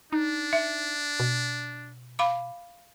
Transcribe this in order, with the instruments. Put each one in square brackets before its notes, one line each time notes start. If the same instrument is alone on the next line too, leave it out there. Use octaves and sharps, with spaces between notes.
[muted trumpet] D4 [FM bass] D#4
[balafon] E5
[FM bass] B2
[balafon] F5 B5 D6